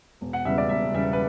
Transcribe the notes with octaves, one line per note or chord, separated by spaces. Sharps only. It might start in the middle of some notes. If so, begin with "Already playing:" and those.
E1
F#5
E2 C#3 G3 E5
D5
E1 E5
E2 C#3 G3 E5
B4